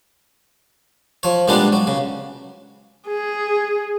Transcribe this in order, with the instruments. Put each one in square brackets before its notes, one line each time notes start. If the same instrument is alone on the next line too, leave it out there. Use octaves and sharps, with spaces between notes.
[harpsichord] F3 C#5
A#2 G3 G#3 B3 D4
F#3
C#3
[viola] G#4